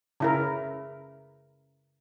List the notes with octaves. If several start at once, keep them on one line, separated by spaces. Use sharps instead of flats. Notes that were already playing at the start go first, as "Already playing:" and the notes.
C#3 E4 A#4